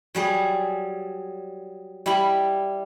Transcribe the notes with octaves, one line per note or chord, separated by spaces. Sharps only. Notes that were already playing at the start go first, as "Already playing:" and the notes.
F#3 G3 G#4
G3 E4 G4 B5